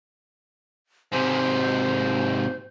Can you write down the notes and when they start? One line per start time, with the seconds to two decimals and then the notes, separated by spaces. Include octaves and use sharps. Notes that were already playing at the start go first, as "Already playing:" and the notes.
1.12 G#2 C3 C5